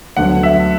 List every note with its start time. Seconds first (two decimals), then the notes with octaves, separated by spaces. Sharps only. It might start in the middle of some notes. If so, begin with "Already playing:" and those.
0.17 D2 D3 F#3 B3 F#5
0.43 E5